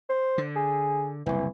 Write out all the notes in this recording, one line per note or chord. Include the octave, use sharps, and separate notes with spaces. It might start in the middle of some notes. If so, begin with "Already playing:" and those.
C5
D3
G#4
F#1 C2 E3